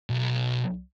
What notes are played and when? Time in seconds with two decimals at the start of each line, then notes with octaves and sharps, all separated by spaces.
0.10 B1